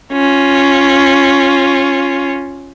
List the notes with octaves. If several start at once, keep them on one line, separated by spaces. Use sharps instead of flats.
C#4 F4